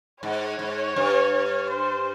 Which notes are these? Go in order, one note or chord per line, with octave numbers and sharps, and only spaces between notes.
G#2 C#5
G#2
G2
C5